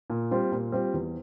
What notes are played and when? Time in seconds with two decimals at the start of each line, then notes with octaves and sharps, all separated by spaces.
0.10 A#2
0.31 G3 C4 F4
0.52 A#2
0.72 G3 C4 F4
0.94 E2